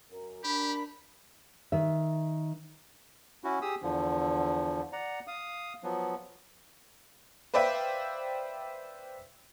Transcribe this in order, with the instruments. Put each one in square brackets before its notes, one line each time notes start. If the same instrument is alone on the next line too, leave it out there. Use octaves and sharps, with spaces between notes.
[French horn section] F#2 A#4
[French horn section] D4 A#4 [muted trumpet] G4 [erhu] B5
[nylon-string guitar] D#3 E5
[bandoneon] C#4 E4 F#4
G4 G#4 D#6 E6
E2 D3 F3
D5 F#5 A#5
F5 D#6
F3 F#3 B3
[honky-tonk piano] B4 C5 D5 E5 F5 G5